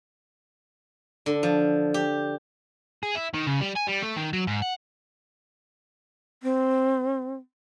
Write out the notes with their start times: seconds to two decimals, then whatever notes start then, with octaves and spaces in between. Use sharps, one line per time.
1.26 D3
1.43 F3
1.94 G4
3.03 G#4
3.15 E4
3.34 D#3
3.47 C#3
3.61 G3
3.76 G#5
3.88 G3
4.03 A3
4.17 D#3
4.33 F#3
4.47 G#2
4.62 F#5
6.43 C4